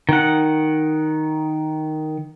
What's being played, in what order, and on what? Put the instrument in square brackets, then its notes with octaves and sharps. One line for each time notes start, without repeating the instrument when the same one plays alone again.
[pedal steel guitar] D#3 F#5